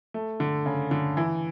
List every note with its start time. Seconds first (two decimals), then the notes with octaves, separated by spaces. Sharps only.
0.14 A3
0.40 D3
0.66 C#3
0.91 D3
1.17 E3